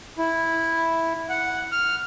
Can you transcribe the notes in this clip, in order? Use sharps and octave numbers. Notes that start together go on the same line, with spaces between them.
E4
F#5
F6